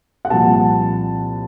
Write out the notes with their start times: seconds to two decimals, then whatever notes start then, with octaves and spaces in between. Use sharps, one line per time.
0.25 F#5
0.30 C2 A#2 F3 A5